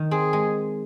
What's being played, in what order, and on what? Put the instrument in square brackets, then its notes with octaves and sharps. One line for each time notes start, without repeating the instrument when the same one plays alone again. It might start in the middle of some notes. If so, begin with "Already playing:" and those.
Already playing: [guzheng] D#3
[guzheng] C4 [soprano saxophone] G#4
[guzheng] G#3